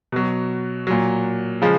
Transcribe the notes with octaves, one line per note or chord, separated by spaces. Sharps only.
B2 F#3
A#2 F#3
C#3 F3 G#3